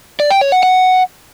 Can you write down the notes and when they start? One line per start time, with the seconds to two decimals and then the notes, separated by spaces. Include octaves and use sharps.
0.20 D5
0.30 G5
0.41 C#5
0.52 F#5
0.63 F#5